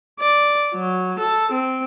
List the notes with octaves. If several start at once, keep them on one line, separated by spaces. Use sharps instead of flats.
D5
F#3
A4
C4